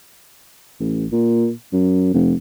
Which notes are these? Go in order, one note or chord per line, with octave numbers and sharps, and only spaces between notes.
A1
A#2
F#2
F1